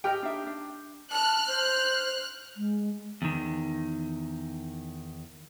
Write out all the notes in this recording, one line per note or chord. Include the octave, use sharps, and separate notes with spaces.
G4 D#5 G5 F6
D4 D#4 E5
D4
A5 F6 F#6
C5
G#3
E2 D#3